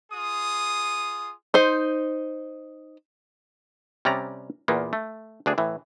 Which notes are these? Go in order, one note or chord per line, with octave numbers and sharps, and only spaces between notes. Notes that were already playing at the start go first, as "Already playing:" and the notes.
F4 G#4 D#6
D#4 C5
C3 G3 C#4 D5 A#5
E2 A#2 A#3 B3
A3
D2 D4 G#4
A2 E3